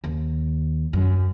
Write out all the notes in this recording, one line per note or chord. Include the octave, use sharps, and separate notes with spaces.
D#2
F#2